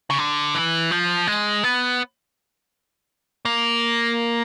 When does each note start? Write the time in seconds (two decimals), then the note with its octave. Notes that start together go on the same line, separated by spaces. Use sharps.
0.10 C#3
0.18 D3
0.54 E3
0.91 F3
1.27 G#3
1.63 B3
3.45 A#3